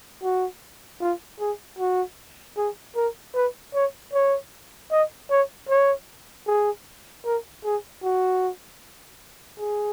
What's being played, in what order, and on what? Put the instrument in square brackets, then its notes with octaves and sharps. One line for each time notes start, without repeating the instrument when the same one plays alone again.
[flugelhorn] F#4
F4
G#4
F#4
G#4
A#4
B4
C#5
C#5
D#5
C#5
C#5
G#4
A#4
G#4
F#4
G#4